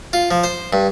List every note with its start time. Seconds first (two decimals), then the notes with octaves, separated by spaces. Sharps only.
0.13 F4
0.31 F3
0.44 C5
0.73 G2